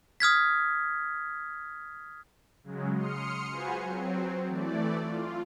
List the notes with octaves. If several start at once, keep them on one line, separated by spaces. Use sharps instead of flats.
D#6 F6 G#6 B6
C#3 F#3 G#3
C6 D#6 F6 C#7
F4 F#4 G#4 B4 C5 G#5
F#3 C4
E3 A3 D5
F4